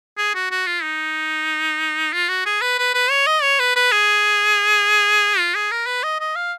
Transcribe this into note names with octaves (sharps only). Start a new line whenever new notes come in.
G#4
F#4
F#4
F4
D#4
F4
F#4
G#4
B4
B4
B4
C#5
D#5
C#5
B4
B4
G#4
F4
G#4
A#4
B4
D#5
D#5
F5